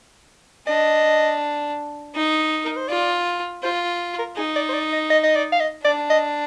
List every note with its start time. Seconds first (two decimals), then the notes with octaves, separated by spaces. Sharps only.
0.67 D4 D#5
2.15 D#4
2.64 A#4
2.77 C5
2.88 F4 D5
3.63 F4 C5
4.19 A#4
4.36 D#4 G#4
4.56 D5
4.69 C5
4.74 D5
4.93 D#5
5.10 D#5
5.23 D#5
5.35 D5
5.52 F5
5.60 D#5
5.85 D4 D5
6.10 D#5